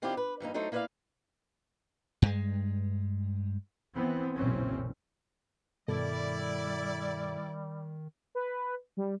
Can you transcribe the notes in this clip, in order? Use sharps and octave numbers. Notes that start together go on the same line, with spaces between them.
D#3 C4 D4 E4 F4 G4
B4
G2 E3 A#3 D#4
F#3 A3 D#4 A4 C5
A#3 E4 B4 C5 D5 F5
G2 G#3
E3 B3 C4
F#1 B1 A#2 E3 C4 C#4
G2 B2 D#3 G3 E4 A4 D5
B4
G3